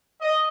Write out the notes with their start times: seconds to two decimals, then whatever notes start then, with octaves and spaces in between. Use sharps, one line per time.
0.21 D#5